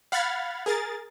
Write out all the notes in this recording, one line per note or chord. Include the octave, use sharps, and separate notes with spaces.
F5 F#5 B5 F6 G#6 A6
G#4 A#4 A6